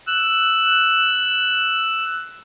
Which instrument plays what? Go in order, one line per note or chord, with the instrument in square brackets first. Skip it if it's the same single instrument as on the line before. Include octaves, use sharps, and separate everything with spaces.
[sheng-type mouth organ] E6 F#6